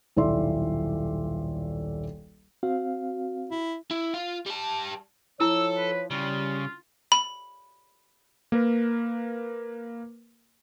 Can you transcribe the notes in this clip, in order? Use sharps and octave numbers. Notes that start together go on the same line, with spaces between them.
D#1 B1 E4 D5 E5 C6
C4 F#4 F5
E4
E4
F4
G3 A5
F3 E4 A4 C#5 E6
B4
C#3 G3 F4
B5
A#3 A#4 B4